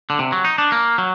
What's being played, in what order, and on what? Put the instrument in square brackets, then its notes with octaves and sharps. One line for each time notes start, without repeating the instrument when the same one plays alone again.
[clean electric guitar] D3
C3
F#3
D#4
D4
A#3
F#3